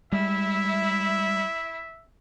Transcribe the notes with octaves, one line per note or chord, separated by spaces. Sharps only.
G3 G#3 E4 E5